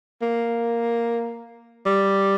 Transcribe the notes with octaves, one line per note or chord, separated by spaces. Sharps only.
A#3
G3